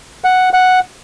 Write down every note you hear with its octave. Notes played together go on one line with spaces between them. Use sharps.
F#5
F#5